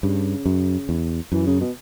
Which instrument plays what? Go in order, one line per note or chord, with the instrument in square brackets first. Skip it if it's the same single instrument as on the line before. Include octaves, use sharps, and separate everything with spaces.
[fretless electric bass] G2 [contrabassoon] C#3
[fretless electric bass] F#2
E2
[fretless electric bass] F#2 [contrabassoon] E3
[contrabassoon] C#3
B2